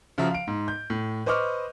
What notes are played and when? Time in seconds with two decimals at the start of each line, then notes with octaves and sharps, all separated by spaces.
0.18 C#3 F3 F#4 E5 A#5
0.31 F5 D7
0.47 G#2
0.68 G6
0.90 A2
1.26 B4 C5 D#5 C#6 D6 F6